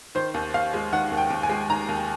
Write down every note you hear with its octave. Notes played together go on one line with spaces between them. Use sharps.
D#3 C5
D#2
D#2 F5
G#3
D#3 F#5
D#2
G5
D#2
G#5
G#3
D#3 A#5
D#2